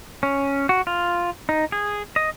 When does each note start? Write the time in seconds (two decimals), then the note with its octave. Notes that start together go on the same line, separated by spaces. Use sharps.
0.23 C#4
0.69 F#4
0.87 F4
1.49 D#4
1.72 G#4
2.16 D#5